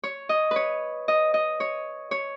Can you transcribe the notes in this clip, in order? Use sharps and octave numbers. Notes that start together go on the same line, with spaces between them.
C#5
D#5
B4 C#5
D#5
D#5
C#5
C#5